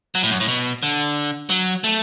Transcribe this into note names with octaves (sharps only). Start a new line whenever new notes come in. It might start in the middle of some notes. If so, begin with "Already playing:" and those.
F#3
A2
F#2
A2
B2
D3
F#3
A3